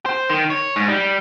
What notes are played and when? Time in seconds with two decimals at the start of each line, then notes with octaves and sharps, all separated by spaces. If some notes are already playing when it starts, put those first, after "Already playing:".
0.06 C5
0.30 D#3
0.50 C#5
0.76 G#2
0.88 G3